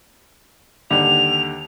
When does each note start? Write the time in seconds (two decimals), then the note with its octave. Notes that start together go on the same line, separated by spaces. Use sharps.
0.90 D#2 D3 G3 F7